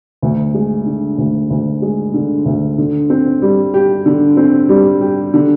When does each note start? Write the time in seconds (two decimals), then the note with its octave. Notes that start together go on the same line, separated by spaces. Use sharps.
0.22 D2
0.54 G#3
0.86 D3
1.18 D2
1.50 D2
1.82 G#3
2.14 D3
2.46 D2
2.78 D3
3.10 C4
3.42 G3
3.74 G4
4.06 D3
4.37 C4
4.69 G3
5.01 G4
5.34 D3